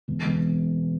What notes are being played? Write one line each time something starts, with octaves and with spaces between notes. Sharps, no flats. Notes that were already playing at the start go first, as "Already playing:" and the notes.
E1
E1